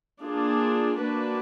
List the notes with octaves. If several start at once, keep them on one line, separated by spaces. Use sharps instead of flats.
A#3 D4 F4 G#4
A#3 D4 F#4 B4